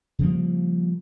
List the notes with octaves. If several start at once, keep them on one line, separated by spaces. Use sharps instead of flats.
C#3 F3 G3 A#3